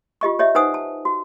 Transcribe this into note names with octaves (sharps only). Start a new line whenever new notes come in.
F4 G4 D#5 C#6
G4 C#5 D#5 E5
D#4 B4 C5 F#5 G#5 D#6
A5
F#4